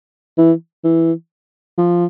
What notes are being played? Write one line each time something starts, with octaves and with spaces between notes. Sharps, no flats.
E3
E3
F3